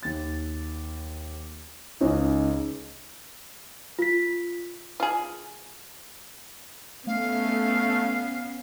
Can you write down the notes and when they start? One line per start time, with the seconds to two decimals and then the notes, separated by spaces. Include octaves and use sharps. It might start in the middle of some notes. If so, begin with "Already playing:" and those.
0.03 D#2 A6
2.01 C#2 C#4 D#4
3.99 F4 B6
5.00 F4 G#4
7.07 A3 B3 C#4 F5